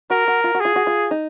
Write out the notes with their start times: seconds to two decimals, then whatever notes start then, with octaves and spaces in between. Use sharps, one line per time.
0.10 F#4 A#4
0.28 F#4
0.44 F4
0.55 F#4
0.60 F4 G#4
0.76 F#4
0.87 F4
1.11 D#4